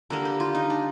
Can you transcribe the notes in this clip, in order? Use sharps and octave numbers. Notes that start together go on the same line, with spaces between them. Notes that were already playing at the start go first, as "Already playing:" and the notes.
D3 G3 A#3 A#4
G4
F4
D#4
D4